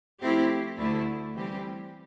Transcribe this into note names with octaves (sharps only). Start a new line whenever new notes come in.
F3 A3 C4 E4 G4
D2 D3 A3 E4 A4
E3 G3 C4 G4